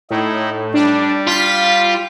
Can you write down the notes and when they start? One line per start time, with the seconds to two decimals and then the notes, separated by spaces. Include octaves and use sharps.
0.10 A2 D#4 E4
0.74 G3 D4
1.27 F4 B6